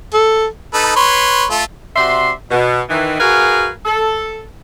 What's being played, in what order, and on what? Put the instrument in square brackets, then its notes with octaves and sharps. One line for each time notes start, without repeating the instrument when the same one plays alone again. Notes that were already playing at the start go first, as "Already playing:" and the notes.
[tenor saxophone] A4
[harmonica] D#4 A4 B4
B4 C#5 C6
A3 F4 A4
[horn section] C3 F#4 D5 E5 C6
B2
D#3 E3
F#4 G#4 A#4 B4 F5 G#5
A4